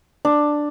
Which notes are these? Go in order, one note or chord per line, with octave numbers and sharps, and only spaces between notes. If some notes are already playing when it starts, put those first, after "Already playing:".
D4